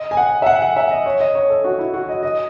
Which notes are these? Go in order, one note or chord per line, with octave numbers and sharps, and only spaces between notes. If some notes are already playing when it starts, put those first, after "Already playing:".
Already playing: D#5
G#5
F#5
E5
F#5
F#5
E5
D#5
C#5
D#5
C#5
A4
F#4
E4
F#4
D#5
D#5